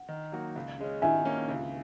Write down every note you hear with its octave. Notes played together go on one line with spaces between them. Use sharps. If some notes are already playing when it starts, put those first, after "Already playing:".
Already playing: F#5
D#3
F#3 A#3 D#4 F#4
C#2
C#3 G#3 C#4
D#3 E5 G#5
A#3 C#4
C#2